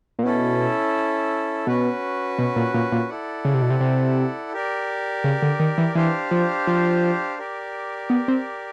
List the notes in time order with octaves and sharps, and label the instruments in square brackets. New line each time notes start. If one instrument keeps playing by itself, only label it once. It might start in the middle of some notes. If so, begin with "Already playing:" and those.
[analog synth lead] A#2
[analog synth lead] B2 [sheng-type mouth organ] C#4 E4 A4
[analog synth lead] B2 [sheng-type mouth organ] C#4 F#4 B4
[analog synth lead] B2
A#2
A#2
A#2
[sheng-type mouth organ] E4 A4 D5 F#5
[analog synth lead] C#3
C3
B2
C3
C3
[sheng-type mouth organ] G4 A#4 D5
[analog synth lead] C#3
D3
D#3
E3
[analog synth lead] E3 [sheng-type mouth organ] D4 G4 C5 F5
[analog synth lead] F3
F3
[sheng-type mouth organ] G4 A#4 D5
[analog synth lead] B3
C4